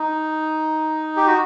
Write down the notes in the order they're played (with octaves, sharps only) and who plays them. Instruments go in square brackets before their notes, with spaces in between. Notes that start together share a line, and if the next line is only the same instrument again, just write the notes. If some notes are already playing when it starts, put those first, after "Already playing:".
Already playing: [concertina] D#4
G4
F#4